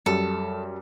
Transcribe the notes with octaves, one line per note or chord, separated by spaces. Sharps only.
F#2 G3 A4